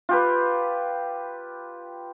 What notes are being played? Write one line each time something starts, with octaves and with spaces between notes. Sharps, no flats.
F4 G4 B4